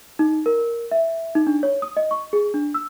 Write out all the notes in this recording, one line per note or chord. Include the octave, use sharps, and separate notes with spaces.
D#4
A#4
E5
D#4
D4
C#5
D#6
D#5
C#6
G#4
D4
E6